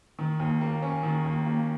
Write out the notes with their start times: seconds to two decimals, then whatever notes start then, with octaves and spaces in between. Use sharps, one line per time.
0.19 D#3
0.40 D#2
0.61 A#3
0.82 C#4
1.03 D#3
1.25 D#2
1.46 A#3